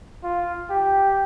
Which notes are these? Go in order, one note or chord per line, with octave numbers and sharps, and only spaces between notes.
F4
G4